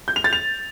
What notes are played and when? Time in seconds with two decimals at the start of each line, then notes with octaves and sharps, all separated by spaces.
0.08 G6
0.16 F7
0.24 A6
0.33 F7